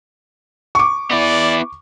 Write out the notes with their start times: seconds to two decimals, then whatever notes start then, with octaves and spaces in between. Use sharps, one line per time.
0.75 C#6 D6
1.11 B3 E4 D5